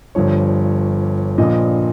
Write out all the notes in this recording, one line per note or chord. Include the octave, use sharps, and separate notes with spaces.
G1 G2 F3 C#5
A#1 A#2 F3 D#5